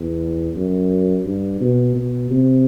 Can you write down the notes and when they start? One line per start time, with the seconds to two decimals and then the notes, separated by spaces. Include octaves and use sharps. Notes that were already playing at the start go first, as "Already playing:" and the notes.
Already playing: E2
0.56 F#2
1.26 G2
1.61 B2
1.96 B2
2.31 C3